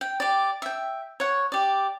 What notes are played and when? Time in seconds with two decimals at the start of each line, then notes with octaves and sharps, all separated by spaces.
0.01 G5
0.20 G4 D5
0.62 E5 G5
1.20 C#5 F#5
1.52 G4 D5